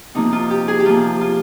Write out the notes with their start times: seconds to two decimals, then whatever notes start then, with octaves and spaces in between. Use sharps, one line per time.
0.15 C3 F3 A#3 D#4
0.33 F4
0.50 G4
0.68 G#4
0.80 G4
0.85 C3 F3 A#3 F4
1.21 F4